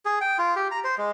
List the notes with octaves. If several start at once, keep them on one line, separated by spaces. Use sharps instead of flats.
G#4
G5
F4
G4
A#5
C5
G#3